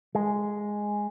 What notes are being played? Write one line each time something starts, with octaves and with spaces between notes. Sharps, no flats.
G#3